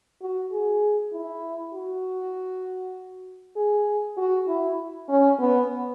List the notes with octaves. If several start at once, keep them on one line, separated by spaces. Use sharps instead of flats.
F#4
G#4
E4
F#4
G#4
F#4
E4
C#4
B3